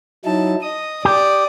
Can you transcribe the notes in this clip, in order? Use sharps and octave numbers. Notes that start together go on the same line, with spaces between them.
F#3 D#4 E4 A5
D#5 D#6
G4 D5